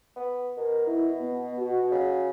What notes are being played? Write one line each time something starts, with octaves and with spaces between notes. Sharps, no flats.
B3
B2 A#4
E4
B3
F#4
C#3